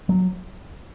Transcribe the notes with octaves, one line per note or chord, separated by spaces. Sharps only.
F#3